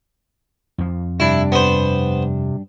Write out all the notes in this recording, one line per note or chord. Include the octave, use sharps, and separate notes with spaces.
F2 F3
G2 C3 D4 E4
B3 C5